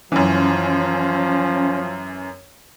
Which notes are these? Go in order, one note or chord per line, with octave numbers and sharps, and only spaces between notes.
F#2 E3 F3 C#4